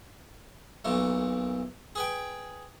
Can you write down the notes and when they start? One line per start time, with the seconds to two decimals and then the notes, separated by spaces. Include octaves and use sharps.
0.85 B1 A#2 A3
1.95 G#4 B4 G5